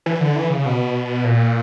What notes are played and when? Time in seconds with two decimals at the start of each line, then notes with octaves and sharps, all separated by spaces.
0.06 E3
0.20 D3
0.36 E3
0.50 C#3
0.66 B2
1.24 A#2